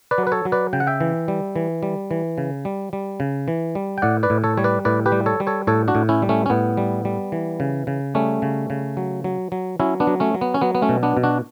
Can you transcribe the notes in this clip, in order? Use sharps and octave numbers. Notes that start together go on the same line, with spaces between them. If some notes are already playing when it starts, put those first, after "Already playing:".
B4 D5
F#3
B4
A4 C#5
F#3
B4 D5
C#3 G5
F#5
E5 G5
E3
G3
E3
G3
E3
C#3
G3
G3
C#3
E3
G3
G5
A2 D5 F#5
B4 D5
A2
A4 C#5
G3 C#5
B4 D5
A2 B4 D5
G4 B4
G3
A4 C#5
G3
A4 C#5
A2 A4 C#5
D4 F#4
A2
C#4 E4
G3
A3 C#4
C#4
A2 B3
G3
G3
E3
C#3
C#3
G3 A3 C#4
C#3
C#3
F#3
F#3
F#3
F#3 C#4 E4
B3 D4
F#3
A3 C#4
F#3
B3
C#4
F#3 B3
B3
A3 C#4
B2
B3 D4
B2
D4 F#4